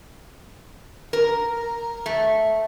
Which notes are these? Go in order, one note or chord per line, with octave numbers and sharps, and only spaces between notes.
A#4
A3